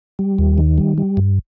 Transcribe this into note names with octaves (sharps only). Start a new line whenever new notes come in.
G3
D#2
D#3
G3
G3
G2